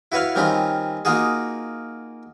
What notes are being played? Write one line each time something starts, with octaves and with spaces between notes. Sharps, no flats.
E4 F#4 B4 C#5 F5
D#3 G3 C4 C#4 D#4 F4
A#3 D#4 F4 F#4 G#4